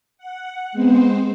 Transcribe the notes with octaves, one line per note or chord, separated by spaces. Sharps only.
F#5
G#3 B3 C4 C5